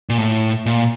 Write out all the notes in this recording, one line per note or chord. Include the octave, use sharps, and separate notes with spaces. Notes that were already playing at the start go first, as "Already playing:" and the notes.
A#2
A2
A#2